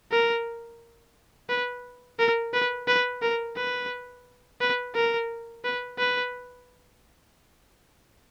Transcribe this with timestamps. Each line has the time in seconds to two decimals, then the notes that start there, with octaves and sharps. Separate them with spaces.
0.12 A#4
1.49 B4
2.19 A#4
2.53 B4
2.88 B4
3.22 A#4
3.57 B4
4.61 B4
4.95 A#4
5.64 B4
5.99 B4